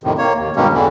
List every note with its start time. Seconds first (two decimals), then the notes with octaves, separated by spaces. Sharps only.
0.04 F2 A2 C3 D#3
0.18 A#3 C#5
0.37 D#2
0.56 G2 B2 D#3 G#3 A#3 C#4
0.73 E2 D3 E3